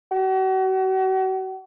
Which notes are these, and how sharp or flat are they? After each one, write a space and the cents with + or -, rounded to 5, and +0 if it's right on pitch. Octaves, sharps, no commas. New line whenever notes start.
F#4 +40